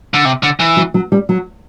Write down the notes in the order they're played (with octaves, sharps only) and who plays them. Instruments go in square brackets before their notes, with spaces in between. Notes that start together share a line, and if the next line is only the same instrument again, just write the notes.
[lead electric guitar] D3
C3
D3
E3
[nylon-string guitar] F#3
F#3
G3
F#3